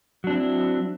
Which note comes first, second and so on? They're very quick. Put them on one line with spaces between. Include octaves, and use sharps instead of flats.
F#3 D4 C4 E4